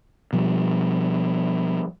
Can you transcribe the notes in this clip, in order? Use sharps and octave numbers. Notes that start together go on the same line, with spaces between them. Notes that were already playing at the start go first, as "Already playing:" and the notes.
B2 F3 G3